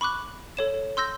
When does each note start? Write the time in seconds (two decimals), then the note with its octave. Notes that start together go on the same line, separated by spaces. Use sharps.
0.01 B5 C#6 D6 F#6
0.57 A4 C#5 E7
0.97 C6 E6 G6 A#6